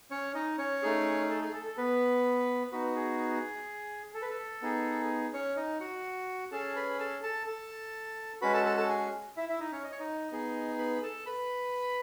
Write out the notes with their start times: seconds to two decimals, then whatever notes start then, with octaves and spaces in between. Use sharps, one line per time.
0.11 C#4 C#5
0.35 D#4 D#5
0.58 C#4 C#5
0.83 A3 D#4 G#4
1.30 A4
1.42 G#4
1.53 A4
1.65 A4
1.77 B3 B4
2.72 B3 D#4 F#4 B4
2.96 G#4
4.14 A4
4.22 B4
4.30 A4
4.62 B3 D#4 G#4
5.34 C#4 C#5
5.57 D#4 D#5
5.80 F#4 F#5
6.52 C#4 G#4 A4 A5
6.76 B4 B5
6.99 A4 A5
7.23 A4 A5
7.47 A4 A5
8.41 G#3 C#4 F#4 B4 B5
8.54 A4 A5
8.65 A4 A5
8.77 A4 A5
8.89 G#4 G#5
9.37 E4 E5
9.49 E4 E5
9.60 D#4 D#5
9.72 C#4 C#5
9.84 D#5
9.92 C#5
10.00 D#4 D#5
10.31 B3 D#4 G#4
10.79 B4 B5
11.03 A4 A5
11.26 B4 B5